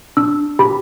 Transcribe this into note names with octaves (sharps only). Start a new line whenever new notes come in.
D4 E6
G4 B5